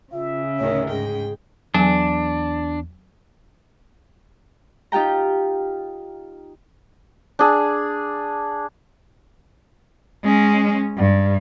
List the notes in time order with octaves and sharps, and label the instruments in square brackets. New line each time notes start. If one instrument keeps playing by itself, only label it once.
[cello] C#3 [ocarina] F4 [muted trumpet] E5
[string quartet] D2 A2 D#3 [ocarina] C#5
[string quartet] G#2 G5 [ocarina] G#4
[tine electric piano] E2 [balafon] F#3 G#5 [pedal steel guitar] D4
[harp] D#4 F4 G4 G5 A#5
[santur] D4 G#4
[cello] G#3 C#4
G2